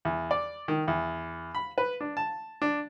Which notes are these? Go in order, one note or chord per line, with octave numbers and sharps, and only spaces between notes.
E2
D5
D#3
E2
B5
B4
D4
A5
D4